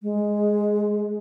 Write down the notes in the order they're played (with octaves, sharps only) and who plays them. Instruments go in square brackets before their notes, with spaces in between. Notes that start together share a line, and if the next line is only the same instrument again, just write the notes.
[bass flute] G#3